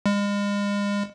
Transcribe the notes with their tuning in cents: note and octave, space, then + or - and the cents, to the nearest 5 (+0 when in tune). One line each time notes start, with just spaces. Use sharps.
G#3 -40